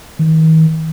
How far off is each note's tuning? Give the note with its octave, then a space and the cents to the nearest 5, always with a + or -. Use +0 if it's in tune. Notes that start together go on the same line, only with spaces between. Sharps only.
D#3 +40